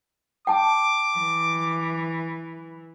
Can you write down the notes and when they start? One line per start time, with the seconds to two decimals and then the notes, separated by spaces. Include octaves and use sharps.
0.47 G5 A5 D6
1.17 E3